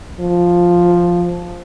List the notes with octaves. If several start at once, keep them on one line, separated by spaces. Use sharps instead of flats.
F3